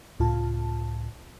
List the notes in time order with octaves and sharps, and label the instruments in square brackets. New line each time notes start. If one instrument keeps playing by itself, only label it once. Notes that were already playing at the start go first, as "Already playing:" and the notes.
[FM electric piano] C#2 A2 F4 A5